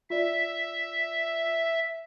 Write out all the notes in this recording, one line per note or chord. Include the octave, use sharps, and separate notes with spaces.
F4 D5 E5